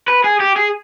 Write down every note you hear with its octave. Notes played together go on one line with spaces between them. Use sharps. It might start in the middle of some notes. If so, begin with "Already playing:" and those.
B4
G#4
G4
G#4